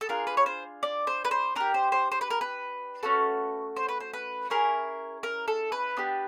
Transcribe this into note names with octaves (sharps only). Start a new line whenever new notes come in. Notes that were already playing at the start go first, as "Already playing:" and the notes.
A4
D4 F4 G#4 A#4
B4
C#5
C5
D5
C5
B4
C5
D4 G4 A#4
C5
C5
C5
B4
A#4
B4
A3 C#4 F#4 A4
C5
B4
C5
B4
C#4 E4 G#4 A#4
A#4
A4
B4
B3 D4 G4